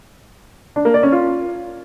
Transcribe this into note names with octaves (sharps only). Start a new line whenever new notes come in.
D4
A#3
D5
C#4
F4